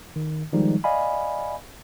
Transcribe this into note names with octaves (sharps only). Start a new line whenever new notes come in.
D#3
D#3 F3 G3 G#3 D#4
D5 D#5 F5 G#5 B5